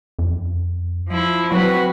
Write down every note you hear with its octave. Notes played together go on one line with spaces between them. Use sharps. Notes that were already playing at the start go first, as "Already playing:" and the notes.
F2
F3 E4
F#3 C4 F#4 B4